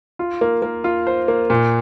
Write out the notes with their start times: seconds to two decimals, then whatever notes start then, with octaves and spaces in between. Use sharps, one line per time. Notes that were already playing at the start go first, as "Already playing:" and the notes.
0.19 F4
0.41 A#3
0.62 A#3
0.84 F4
1.07 C5
1.28 A#3
1.50 A#2